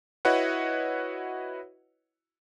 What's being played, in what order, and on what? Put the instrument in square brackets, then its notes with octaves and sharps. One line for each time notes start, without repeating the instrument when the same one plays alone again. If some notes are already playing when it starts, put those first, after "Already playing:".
[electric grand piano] E4 F#4 B4 C#5 D#5 F#5